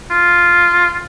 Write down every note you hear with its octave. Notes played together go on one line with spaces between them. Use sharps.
F4